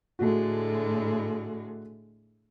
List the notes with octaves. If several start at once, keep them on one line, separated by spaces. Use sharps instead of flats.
A2 D3 G#3 A3 F#4